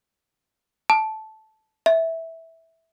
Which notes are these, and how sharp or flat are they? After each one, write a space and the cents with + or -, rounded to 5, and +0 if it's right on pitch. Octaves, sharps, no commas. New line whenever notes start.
A5 -10
E5 -10